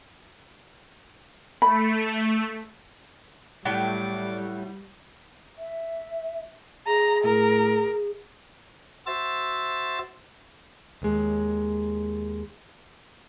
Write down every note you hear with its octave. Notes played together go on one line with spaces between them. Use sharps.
A3 B5
A2 F#3 G3 D5
E5
G#4 A#5
A2 A#4
F#4 C5 E5 E6 A6
D#2 G#3